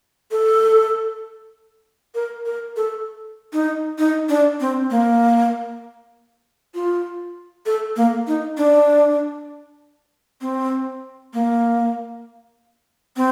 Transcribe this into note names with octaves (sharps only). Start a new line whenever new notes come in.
A4
A#4
A#4
A4
D#4
D#4
D4
C4
A#3
F4
A4
A#3
D#4
D4
C4
A#3
C4